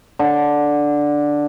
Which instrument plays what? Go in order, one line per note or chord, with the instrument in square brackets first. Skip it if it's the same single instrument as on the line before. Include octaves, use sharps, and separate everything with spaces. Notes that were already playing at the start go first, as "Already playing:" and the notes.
[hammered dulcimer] D3